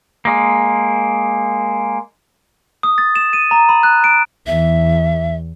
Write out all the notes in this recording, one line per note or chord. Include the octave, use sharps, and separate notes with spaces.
G#3 A#3
D#6
A6
E7
D#7
A#5
B5
F#6
D7
E2 E5